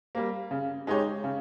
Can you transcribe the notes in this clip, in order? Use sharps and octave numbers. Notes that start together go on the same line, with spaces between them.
G3 A#3
C#3
G#3 D#4 G4 C#5
C#3